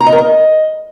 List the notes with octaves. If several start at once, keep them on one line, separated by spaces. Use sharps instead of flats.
A#5
D#5
A#4
D#5